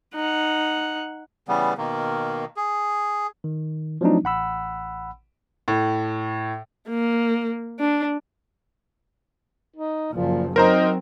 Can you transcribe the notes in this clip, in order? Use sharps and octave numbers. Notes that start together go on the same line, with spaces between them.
D#4 F#5
C#3 E3 G3 B3
B2 D#3 A#3
G#4
D#3
F3 F#3 A3 C4 D4 D#4
A1 F#5 B5 E6
A2
A#3
D4
D#4
F#1 A#2 F3
F#3 C4 D#4 A#4 C5 A#5